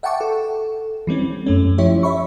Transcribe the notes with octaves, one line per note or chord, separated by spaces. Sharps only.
E5 F#5 G5 A5 C#6 D6
A4
E3 G3 C4 C#4
F#2 A3 C#4
F3 E4 G4 C#5 E5
C#5 E5 B5 C#6